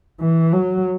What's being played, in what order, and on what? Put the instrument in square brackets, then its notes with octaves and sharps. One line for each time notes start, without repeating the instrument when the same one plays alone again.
[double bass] E3
F#3